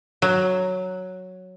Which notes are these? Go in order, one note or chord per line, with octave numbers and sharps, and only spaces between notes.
F#3